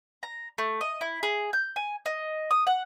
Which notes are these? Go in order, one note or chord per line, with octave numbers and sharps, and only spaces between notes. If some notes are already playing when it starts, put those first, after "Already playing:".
A#5
A3
D#5
E4
G#4
G6
G#5
D#5
D#6
F#5